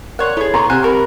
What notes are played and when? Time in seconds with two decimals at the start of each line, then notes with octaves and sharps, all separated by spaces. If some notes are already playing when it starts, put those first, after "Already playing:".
0.19 A#4 C#5 D5 F#5 C6
0.37 B3 E4 G#4 A4 C#5
0.54 B3 A#5 C6 C#6
0.70 C3 C5 F#5 G#5 A#5 F6 F#6
0.83 F#4 A#4 B5